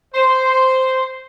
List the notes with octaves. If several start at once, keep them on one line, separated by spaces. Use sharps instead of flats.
C5